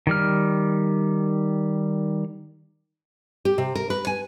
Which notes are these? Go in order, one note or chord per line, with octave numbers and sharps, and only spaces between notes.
D#3 G3 F6
G4
C3
A#4
B4
G#5